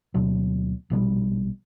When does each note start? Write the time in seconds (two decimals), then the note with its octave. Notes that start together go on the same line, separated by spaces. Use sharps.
0.14 D2 B2 F#3
0.90 A#1 B2 F3 G3